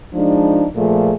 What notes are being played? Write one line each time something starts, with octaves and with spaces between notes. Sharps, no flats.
F3 G#3 D4 D#4
A#2 F3 A3 G#4